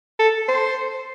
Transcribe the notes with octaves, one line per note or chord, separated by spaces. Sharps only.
A4
C5